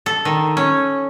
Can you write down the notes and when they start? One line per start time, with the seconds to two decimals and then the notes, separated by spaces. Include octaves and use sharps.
0.06 A4
0.25 D#3
0.57 C#4